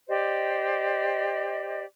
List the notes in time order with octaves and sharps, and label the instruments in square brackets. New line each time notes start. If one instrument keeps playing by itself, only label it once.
[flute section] G4 C5 D5 D#5